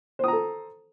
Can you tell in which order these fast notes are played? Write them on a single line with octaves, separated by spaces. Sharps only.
C5 D#6 A#5 A4